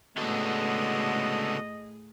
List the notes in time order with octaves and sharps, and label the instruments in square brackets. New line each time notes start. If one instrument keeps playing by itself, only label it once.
[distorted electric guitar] C#2 D3 [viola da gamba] A2 G#4 [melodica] B3 F#4 A4 [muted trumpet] D#5